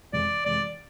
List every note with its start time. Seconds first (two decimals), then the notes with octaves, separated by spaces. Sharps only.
0.13 F2 C3 E3 G#3 D5
0.45 F2 C3 E3 G#3 D5